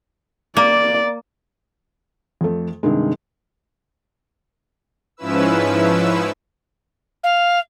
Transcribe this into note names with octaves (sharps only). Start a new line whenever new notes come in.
A#3 D5
F2 A3
G2 C3 D#3 G#3
G#2 F3 C#4 E4 B4 E6
F5